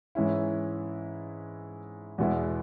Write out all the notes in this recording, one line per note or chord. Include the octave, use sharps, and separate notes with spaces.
G#2 E3 C#4 E4
E2 B2 G#3 B3 E4